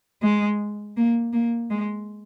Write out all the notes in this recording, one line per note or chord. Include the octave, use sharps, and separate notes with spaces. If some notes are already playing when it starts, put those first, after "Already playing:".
G#3
A#3
A#3
G#3